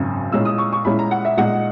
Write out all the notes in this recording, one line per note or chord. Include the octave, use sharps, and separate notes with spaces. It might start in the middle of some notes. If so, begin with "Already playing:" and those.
Already playing: G#1 F#2 C#3
A#2 G#3 C#4 E4 E6
D#6
C#6
C#6
A#2 G#3 C#4 E4 B5
A#5
F#5
E5
A#2 G#3 D#4 F#5